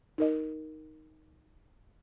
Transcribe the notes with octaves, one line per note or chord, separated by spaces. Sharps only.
D#4 A#4 D#5